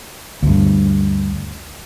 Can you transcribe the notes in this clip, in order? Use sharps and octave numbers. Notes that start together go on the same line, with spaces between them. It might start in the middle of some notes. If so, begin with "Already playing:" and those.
D2 G2